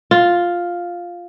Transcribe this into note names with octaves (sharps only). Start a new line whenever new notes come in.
F4